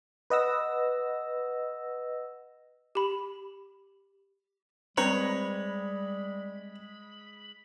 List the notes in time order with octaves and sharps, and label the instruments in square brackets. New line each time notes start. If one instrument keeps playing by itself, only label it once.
[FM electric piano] B4 D#5 F#5 E6 A#6
[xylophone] G4 B5
[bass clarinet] G3 [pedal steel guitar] G#3 B5 [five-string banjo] C4 B4 A#5 [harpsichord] C#5